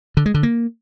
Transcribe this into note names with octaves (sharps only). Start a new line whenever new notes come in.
D3
G#3
D3
A#3